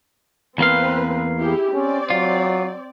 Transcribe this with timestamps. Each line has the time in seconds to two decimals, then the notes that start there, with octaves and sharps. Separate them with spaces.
0.58 E2 A#3 C4 B4 F5
1.39 E4 G4 G#4
1.74 C4 C#4 D5
2.10 F#3 F4